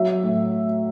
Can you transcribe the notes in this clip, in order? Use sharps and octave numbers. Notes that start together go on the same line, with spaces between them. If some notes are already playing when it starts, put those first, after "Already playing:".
Already playing: F#3 E5
A2